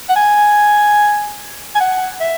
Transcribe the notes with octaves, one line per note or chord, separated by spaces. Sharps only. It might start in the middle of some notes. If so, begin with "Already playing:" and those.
F#5
G#5
G#5
F#5
E5